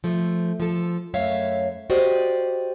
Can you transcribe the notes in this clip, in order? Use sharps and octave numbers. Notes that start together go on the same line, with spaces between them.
F3 A3
F3 A4
F#2 A3 C#5 E5 F5
F#4 G4 C5 D5 D#5